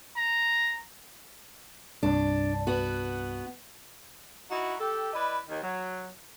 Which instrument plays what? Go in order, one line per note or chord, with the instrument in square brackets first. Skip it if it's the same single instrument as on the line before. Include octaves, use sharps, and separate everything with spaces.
[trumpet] A#5
[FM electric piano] C2 G2 C3 [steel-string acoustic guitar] D4
[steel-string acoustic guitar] B3 F#4
[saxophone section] D#4 E4 F#4
G4 A4
E4 B4 D5 D#5
D#2 D#3
F#3